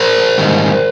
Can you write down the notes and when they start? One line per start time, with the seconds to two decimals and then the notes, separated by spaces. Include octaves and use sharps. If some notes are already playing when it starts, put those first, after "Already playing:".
Already playing: A#4 C5
0.38 G#2 D#3 G3